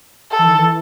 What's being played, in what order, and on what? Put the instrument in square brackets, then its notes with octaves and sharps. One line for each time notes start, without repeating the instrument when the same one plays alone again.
[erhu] A4
[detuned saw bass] E3
D#3
E3